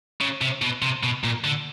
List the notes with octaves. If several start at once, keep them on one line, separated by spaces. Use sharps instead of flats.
C#3
C3
B2
C3
B2
A#2
D3